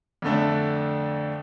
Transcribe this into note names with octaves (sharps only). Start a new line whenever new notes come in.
F2 D3 A3 D4